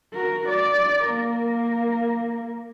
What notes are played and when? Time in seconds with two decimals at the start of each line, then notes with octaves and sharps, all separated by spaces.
0.13 F#4 A#4
0.48 D5
1.04 A#3 A#4